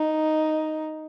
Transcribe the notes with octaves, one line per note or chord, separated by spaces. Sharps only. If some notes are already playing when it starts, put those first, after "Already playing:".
Already playing: D#4